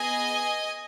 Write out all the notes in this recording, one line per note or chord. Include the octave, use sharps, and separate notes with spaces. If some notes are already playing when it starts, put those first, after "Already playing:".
Already playing: B3 G#4 D#5 G#5